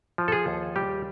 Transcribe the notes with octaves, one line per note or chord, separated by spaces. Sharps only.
F3
A4
G#4
D#2
G3 G4